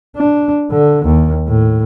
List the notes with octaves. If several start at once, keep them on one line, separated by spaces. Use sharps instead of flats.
D4
D3
D#2
A2